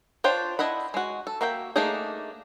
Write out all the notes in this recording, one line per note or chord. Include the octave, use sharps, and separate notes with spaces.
D4 F4 C5 C#5 G5
D4 E4 D#5 F#5 B5
G#3 F#4
A4
A#3 F#4 E5 G5
A3 A#3 D4 D#4 G#4